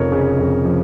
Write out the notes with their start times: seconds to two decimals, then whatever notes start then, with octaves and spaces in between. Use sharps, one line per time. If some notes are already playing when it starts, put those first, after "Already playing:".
Already playing: F1 F2 C#3 F3 A#4 C#5
0.12 C#3
0.39 F2
0.65 F3